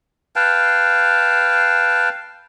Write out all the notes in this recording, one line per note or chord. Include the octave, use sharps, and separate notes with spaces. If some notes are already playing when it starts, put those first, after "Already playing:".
B4 F5 G5 A5